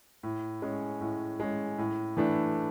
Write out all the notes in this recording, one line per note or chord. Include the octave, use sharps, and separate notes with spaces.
A2
G#3 C#4
A2
G#3 C#4
A2
E3 A3 D4